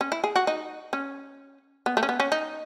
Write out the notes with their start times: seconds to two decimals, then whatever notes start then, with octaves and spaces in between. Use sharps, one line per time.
0.01 C#4
0.12 E4
0.24 G#4
0.36 F#4
0.47 D#4
0.93 C#4
1.86 B3
1.97 A3
2.03 C#4
2.09 B3
2.20 C#4
2.32 D#4